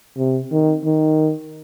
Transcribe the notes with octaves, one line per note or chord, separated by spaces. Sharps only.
C3
D#3
D#3